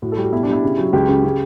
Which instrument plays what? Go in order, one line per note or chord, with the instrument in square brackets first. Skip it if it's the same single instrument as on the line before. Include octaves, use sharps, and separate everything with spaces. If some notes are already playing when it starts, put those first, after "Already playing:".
[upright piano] A2 F#4
A4
G3
F#4
B2 E4
D4
G3 E4
C#3
F#3
C#2 G4
C#3
C#3